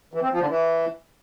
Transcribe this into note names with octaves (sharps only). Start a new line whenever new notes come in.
E3
C4
F3
D3
E3